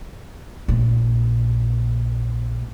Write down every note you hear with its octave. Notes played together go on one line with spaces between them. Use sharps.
A#1 A#2